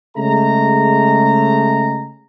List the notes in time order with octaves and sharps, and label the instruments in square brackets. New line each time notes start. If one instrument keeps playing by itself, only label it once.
[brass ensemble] C#3 G#3 A3 A#5